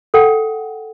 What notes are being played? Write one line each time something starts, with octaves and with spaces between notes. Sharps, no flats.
A4 F#5 G5